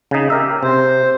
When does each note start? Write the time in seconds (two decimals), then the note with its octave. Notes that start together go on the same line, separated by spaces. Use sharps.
0.11 C#3 D#4
0.30 G4 A#4 E5
0.63 C3 C5